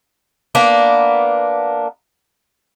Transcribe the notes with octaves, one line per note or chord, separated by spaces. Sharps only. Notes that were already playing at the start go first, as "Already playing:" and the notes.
A#3 B3 D4